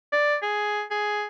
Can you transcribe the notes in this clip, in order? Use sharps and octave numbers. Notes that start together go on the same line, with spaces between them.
D5
G#4
G#4